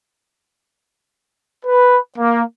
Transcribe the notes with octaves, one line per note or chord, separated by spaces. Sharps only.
B4
A#3